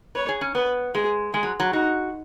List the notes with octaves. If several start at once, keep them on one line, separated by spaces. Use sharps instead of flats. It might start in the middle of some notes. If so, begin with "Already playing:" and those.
B4 C#5
G#4
C#4
B3 B4
G#3 G#4
G#3 G#4
F#3
F#3
D#4 F#4